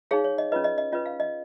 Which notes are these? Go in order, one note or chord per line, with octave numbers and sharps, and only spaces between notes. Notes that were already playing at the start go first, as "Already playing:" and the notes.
D#4 G#4 C#5 F5
C#5
D#5
C#4 F4 B4 D#5
D#5
D#5
C#4 F4 B4 D#5
F5
D#5